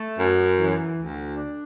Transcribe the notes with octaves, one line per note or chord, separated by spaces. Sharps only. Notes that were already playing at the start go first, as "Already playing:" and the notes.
Already playing: A3
F#2
E3
D2
D4